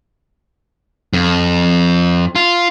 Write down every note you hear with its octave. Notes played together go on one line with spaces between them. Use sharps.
F2
F4